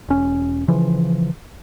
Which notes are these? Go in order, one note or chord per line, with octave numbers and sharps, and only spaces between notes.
E1 C#4
C#3 E3 F3